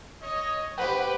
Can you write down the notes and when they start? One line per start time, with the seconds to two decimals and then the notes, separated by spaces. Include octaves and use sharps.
0.21 C#5 D#5
0.78 G4 B4 C5 F#5 G5 B5